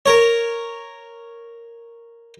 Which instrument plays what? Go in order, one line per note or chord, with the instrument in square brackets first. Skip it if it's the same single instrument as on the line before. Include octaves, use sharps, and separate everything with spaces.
[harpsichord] A#4 C#5